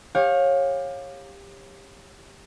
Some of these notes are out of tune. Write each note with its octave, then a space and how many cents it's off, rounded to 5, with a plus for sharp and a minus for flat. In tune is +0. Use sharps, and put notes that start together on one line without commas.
G4 +20 C#5 -20 F5 +20